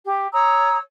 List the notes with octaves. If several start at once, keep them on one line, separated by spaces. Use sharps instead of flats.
G4
C#5 A#5 D#6 E6